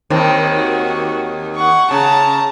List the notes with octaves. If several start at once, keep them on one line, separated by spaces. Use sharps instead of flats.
D#2 D#3 C4
F#4
F#5 C#6
C#3 A5 A#5